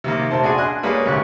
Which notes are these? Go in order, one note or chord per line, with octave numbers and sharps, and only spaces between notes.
C3 D#3 A#3
C3 A3 C5 A5
D4 F#4 G#4 D5 G#5 C6
D4 D#5 G#5 C6 F#6
G3 A#3 G#4 B4 C#5 D5
A1 D2 C3 G4 C#6 F#6